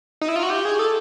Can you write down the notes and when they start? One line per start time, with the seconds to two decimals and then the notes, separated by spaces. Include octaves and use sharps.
0.21 D#4
0.28 E4
0.36 F4
0.43 F#4
0.50 G4
0.65 G#4
0.79 A4